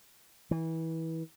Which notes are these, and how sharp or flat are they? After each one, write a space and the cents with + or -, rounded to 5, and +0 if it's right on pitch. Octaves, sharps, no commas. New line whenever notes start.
E3 -25